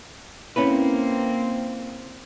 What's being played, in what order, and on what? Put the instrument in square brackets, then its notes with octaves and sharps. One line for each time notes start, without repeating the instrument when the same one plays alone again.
[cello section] A#3 C4 [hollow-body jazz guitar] C#4 E4 B4